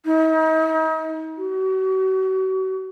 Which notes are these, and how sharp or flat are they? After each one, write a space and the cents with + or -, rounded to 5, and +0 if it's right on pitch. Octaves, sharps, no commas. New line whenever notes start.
D#4 +40
F#4 +40